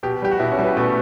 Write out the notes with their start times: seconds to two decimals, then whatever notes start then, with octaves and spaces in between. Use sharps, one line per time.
0.03 B2 G4
0.22 G3 G4
0.31 F#4
0.39 B2 E4
0.52 C#4
0.59 G3
0.64 B3
0.77 B2 A3